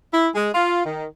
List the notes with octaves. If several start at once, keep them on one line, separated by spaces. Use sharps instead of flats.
E4
G#3
F4
D#3